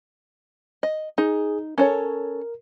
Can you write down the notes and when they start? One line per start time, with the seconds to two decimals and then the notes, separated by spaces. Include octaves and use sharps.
0.83 D#5
1.18 D#4 G#4
1.78 C#4 A4 A#4 C#5